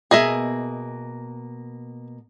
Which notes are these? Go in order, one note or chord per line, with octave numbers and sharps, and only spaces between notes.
B2 A#3 G#4 D#5 E5